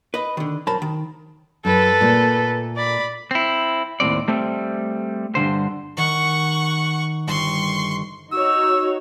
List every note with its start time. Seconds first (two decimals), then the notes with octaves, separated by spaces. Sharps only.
0.14 B4 D#5
0.37 D3 D#3
0.67 F#2 A#4 C5 A5 B5
0.82 D#3
1.65 F#2 A4 B4
2.01 A#2 A3
2.77 D5 B5
3.31 C4 E4
4.00 D#2 A2 G#3 C4 D5
4.28 G3 A3 C4
5.35 G2 B2 D3 C5
5.97 D#3 F#5 C#6
7.27 G1 C6 C#6
8.32 D#4 F#4 C#5 E6